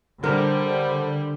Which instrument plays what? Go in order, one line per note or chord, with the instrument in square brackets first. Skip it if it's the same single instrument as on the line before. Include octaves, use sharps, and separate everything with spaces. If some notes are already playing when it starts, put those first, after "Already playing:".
[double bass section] D3 [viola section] G3 [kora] A#4 [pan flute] C5